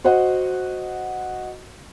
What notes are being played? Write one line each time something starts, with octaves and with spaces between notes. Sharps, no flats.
F#4 C5 D#5 F#5